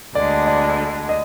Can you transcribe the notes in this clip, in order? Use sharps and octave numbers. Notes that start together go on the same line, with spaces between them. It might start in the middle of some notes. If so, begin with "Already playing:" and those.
D2 D3 G#3 D4 D5
D5
D#5